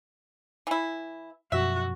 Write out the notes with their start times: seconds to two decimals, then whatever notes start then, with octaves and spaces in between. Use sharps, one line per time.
0.67 E3 E4
1.52 F#2 B2 F3 F#4 E5